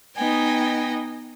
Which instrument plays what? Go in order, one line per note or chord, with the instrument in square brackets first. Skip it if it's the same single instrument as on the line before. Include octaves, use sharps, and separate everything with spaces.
[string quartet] B3 D#4 D#5 G5 G#5